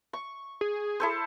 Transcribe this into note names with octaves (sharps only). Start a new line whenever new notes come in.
C#6
G#4
E4 A4 C5